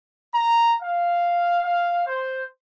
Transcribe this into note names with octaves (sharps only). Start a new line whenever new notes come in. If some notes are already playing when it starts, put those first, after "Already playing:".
A#5
F5
F5
C5